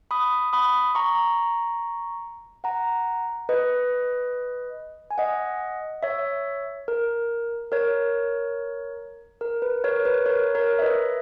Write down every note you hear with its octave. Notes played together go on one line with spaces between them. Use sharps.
B5 D#6
B5 D#6
A#5 C#6
F#5 A#5
B4 D#5
G#5
D#5 F#5
C#5 E5
A#4
A#4 C#5
A#4
B4
A#4 C#5
B4
A#4 C#5
A#4 C#5
E5
B4 D#5